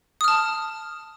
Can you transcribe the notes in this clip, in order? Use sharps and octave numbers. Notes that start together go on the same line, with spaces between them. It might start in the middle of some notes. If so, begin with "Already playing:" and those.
A5 D#6 F6